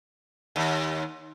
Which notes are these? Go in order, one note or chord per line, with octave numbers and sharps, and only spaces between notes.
D#2